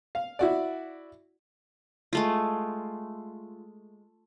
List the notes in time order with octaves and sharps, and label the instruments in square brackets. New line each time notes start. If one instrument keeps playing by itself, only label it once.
[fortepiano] F5
E4 F#4 D5
[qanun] G#3 A3 F4